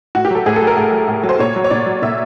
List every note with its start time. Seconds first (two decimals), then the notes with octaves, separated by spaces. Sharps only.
0.15 A2 F#4
0.25 G4
0.31 F#3 A4
0.46 A2 G#4
0.56 A4
0.62 F#3
0.67 A#4
0.77 A2
0.92 F#3
1.08 A2
1.23 F#3
1.29 C5
1.39 A#2 C#5
1.56 F#3
1.64 C#5
1.70 A#2 D5
1.86 F#3
2.02 A#2 E5